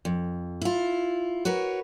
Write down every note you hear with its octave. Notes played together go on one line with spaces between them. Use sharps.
F2
E4 F4
F#4 A#4 B4 C#5